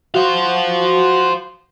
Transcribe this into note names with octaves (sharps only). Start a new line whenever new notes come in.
F#4 C5 F5